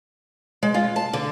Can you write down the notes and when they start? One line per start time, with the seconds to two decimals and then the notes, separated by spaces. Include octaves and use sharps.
0.63 G#3
0.74 F4
0.96 A5
1.13 D3